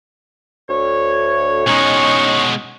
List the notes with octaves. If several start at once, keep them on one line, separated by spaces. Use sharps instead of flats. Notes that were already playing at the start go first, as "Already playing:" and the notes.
D2 C#5
B2 G#3 C#4 D#4 C#6